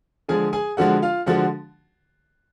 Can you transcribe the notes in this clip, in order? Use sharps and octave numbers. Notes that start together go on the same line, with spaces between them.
D3 F3 G#3 G#4 G#5
G#4 G#5
D3 F3 G#3 F#4 F#5
F4 F5
D3 F3 G#3 F#4 F#5